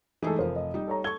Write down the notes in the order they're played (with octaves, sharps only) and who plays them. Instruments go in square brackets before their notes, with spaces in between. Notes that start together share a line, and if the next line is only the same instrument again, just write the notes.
[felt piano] E3 D#4 G#4 [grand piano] G#3 A3 A4
[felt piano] F1 F3 [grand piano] A#4 C5
[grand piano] D#5
[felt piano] G3 D#4
[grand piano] A4 C#5 A#5
[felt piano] A4 C#6 [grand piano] G#6 G7